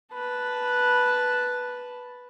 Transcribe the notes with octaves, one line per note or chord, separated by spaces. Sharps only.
B4 A5